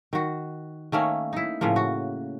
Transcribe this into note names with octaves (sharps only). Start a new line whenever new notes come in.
D#3 F#4
D#3 A3 A#3 C#4
D#4 E4
A2 C#3 F3 A#3
F#4